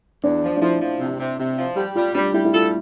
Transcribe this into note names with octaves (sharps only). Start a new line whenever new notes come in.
E2 D4
F3
D4
F3 E4
F3
C3
C3
C3
F3
G3 G4
G3 F4
G3 D4
G3 E4
E4
F4 A4